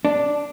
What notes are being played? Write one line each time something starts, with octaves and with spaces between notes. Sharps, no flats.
D4